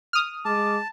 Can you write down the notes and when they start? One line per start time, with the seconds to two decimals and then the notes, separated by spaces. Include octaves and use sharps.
0.13 D#6 F6
0.45 G#3 A5 D6